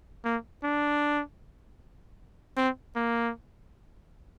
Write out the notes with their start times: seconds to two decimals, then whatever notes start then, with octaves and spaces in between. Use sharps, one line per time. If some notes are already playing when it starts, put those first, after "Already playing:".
0.25 A#3
0.63 D4
2.57 C4
2.96 A#3